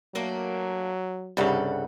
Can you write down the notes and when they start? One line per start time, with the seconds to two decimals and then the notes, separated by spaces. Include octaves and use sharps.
0.15 F#3 A3 A#3 D4
1.37 C2 G2 C#3 G3 A4 F#5